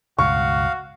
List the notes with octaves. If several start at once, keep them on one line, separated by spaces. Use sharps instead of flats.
C#2 G2 B2 F#4 F5 C#6